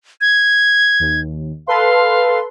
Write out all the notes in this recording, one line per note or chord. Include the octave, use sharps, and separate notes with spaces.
G#6
D#2
A4 B4 F5 C6